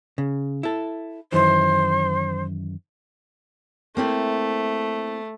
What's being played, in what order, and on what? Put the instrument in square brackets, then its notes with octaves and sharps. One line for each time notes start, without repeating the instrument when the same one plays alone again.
[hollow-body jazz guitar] C#3
E4 A4
[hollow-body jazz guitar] F#2 D#3 E3 [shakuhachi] C5
[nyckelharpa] A3 [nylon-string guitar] A#3 C4 E4